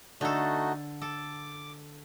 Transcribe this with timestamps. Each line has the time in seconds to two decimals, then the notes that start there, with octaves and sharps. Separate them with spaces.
0.21 D3 A3 D#4 F#4 A4
1.02 A4 D6